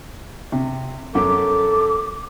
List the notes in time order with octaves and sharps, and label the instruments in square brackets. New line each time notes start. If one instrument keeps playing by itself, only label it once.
[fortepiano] C3
[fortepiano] F#2 [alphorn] A4 [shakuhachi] D6